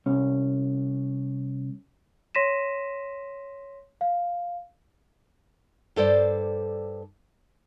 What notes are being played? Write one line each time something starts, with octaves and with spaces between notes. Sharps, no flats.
C2 C#4
C#5 C6 A#6 B6 D#7 E7
F5
G2 A4 C5 D5